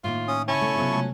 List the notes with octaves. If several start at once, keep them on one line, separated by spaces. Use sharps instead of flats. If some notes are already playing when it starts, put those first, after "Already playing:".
A2 D#3 A#3 F4
C#4 D#6
C#3 C#4 E4 A5 C#6
B2 A3
C3 F#3 B3 F4 A4
C3 G#3 A3